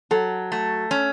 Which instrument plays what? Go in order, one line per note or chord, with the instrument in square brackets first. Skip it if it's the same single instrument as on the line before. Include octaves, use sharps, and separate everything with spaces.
[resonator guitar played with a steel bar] F#3 [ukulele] A4
[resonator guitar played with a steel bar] A3
C#4